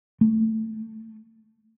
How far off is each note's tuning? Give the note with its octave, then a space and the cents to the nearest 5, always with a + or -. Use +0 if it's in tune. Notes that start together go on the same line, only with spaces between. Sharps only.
A3 +10